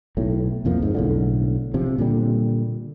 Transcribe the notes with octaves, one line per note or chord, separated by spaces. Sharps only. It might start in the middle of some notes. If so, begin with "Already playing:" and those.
B1 A2
C2 F2 F3 A#3
G#2
B1 A2 D3
C3 F3
A#2 D3 G3